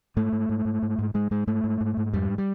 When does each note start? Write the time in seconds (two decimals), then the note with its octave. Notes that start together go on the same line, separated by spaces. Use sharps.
0.17 G#2 A3
0.33 G#2
0.49 G#2
0.65 G#2
0.82 G#2
0.99 G#2
1.14 G#2 G#3
1.31 G#2 G#3
1.47 G#2 A3
1.64 G#2
1.81 G#2
1.97 G#2
2.13 F2 G3
2.38 G3